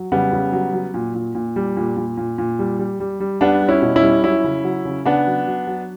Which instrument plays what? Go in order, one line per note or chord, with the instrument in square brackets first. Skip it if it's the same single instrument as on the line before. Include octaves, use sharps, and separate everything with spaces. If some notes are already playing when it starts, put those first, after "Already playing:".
Already playing: [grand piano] F#3
C#3 G3 B3
C#3
F#3
F#3
A#2
A#2
A#2
G3
A#2
A#2
A#2
A#2
G3
G3
G3
G3
G3 B3 D4
G3
C#4 E4
B2
C#4 E4
G3
F#3 C#4 E4
C#3
F#3
C#3
C#3 B3 D4
F#3
F#3
F#3